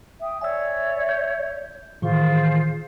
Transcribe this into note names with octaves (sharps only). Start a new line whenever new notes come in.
E5 G5 D#6
C#5 D5 E5 G#5 E6
G6
A2 D#3 E3 F4 G#4 C5